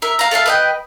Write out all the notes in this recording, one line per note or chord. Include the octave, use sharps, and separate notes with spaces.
A#4 E5
F5 A#5
A4 D5 E5 F5
B4 D#5 G5